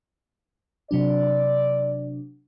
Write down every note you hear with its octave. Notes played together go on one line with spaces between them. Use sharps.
C3 F#3 D4 D5